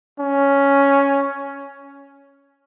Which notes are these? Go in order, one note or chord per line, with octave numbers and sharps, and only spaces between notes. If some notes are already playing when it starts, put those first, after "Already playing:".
C#4